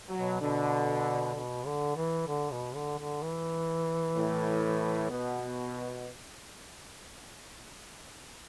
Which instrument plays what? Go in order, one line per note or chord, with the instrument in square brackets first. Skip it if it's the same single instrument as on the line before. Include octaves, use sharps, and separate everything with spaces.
[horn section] F#3
[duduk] B2
[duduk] B2 [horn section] D3
[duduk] B2
D3
E3
D3
B2
D3
D3
E3
[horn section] A2
[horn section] B2 [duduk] B3